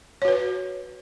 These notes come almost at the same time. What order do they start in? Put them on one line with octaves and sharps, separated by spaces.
C#5 F#4 B4